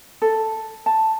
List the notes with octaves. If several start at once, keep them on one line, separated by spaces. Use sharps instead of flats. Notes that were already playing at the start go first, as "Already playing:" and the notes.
A4
A5